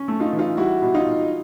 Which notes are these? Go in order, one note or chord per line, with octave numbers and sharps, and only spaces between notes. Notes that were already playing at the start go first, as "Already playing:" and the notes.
Already playing: C#4
A3
D#4 F4
E3
D#4 F4
G3 E4 F#4
B2
D#4 F4
B2